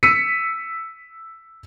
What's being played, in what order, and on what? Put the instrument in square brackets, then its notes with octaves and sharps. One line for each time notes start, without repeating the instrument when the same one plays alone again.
[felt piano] E6 B6 C#7 D#7